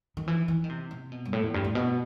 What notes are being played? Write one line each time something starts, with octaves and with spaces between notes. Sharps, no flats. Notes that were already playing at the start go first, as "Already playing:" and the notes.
D#3
E3
E3
D#3
C3
C3
B2
G2
A2
E2
G2
A2
B2